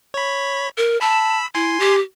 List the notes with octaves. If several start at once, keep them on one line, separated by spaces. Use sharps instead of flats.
C#5 B5
A#4
A5 B5 E6
E4 G#5 C6
G4